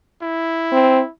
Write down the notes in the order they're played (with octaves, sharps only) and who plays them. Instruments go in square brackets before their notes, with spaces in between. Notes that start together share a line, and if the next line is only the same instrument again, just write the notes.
[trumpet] E4
[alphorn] C4